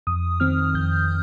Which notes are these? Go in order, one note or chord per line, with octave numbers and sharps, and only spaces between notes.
F2 D#6
D#3 C4 F6
F2 G6